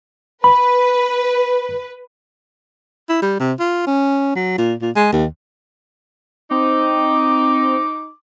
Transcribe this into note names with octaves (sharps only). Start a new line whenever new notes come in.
B4 B5
E4
G3
C3
F4
C#4
F#3
A#2
A#2
G#3
D#2
C4 D#4 D6